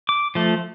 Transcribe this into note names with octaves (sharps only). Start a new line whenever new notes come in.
D6
F3 A3